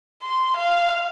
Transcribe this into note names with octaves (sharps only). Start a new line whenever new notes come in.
C6
F5